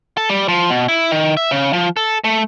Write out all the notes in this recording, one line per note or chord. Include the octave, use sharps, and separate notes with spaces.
A4
G3
F3
B2
E4
D#3
E5
C#3
F3
A4
A3